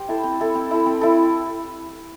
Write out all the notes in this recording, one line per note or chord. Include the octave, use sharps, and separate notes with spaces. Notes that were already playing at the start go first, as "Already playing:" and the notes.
Already playing: G4 C5
E4 A4
C4
E4 A4
C4
E4 A4
C4
E4 A4